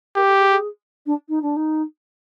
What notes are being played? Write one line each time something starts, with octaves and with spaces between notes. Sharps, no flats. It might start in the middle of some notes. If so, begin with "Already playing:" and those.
G4 A#4
A4
G#4
G#4
D4
D#4
D4
D#4